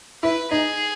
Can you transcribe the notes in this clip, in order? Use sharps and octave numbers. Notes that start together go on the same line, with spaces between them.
E4 B4
D#4 G#4